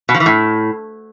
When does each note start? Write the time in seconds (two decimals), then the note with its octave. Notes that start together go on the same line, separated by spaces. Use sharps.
0.09 B2
0.15 F3
0.20 E3
0.26 A2